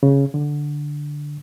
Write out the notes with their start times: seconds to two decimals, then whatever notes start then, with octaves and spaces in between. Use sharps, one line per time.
0.03 C#3
0.34 D3